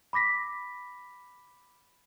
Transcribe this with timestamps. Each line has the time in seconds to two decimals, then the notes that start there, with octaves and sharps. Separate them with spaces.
0.13 B5 D6 A#6 B6